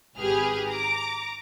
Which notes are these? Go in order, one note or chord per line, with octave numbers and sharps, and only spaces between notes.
G#1 G4 G#4 B4 F6
A#5 D6